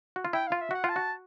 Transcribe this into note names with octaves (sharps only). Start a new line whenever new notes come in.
F#4
F4
E4 G5
F4 F5
E5
F#4 F#5
F4
A5
F#4